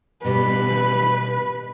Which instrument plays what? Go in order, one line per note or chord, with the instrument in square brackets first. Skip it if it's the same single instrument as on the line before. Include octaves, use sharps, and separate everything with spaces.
[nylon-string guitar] B2 G3 [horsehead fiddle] B4